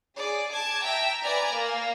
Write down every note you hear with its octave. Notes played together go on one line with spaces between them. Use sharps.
G#4 D5
A5 D6 G#6
E5 G5 A#5
B4 D5 G#5 A#5
A#3